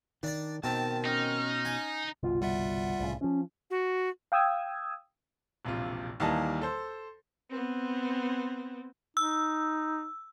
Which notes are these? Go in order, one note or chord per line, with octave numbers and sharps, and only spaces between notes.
D#3 D4 D5
B2 D#3 C4 A5
C#4 D#4 F6
G#5
G1 C2 B2 F4
G3 F4 E5 F#5
C2 A2 C#3
E3 F3 C#4
F#4
F5 G5 D#6 E6 G#6
E1 A#1 C3 F4
D#2 E3 G3 A#3 D#5 A5
A4 C5
B3 C4
D#4 E6